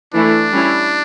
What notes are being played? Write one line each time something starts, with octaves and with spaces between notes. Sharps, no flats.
E3 A3 D4 E4
G3 C#4 E4